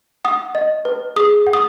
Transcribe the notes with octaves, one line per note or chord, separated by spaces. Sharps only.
F#5 D#6
D#5
B4
G#4 D#6
F#5
D#6